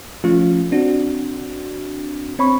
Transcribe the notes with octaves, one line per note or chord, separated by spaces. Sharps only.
F3 A3 C#4 F4
C4 D4 F#4
C4 C#5 B5 C#6